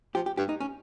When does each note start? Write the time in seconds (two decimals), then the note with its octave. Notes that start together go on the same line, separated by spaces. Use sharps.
0.15 F3 G4
0.26 G4
0.37 G2 G4
0.49 D#4
0.60 C#4